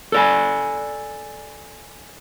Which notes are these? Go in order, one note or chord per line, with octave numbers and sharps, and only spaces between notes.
A4 D5 G#5